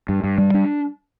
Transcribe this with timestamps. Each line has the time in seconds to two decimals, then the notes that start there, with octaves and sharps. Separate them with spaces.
0.09 G2
0.24 G2
0.38 G3
0.54 D4